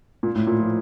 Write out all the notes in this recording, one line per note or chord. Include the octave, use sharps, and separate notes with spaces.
A#2
A2
A#2
F3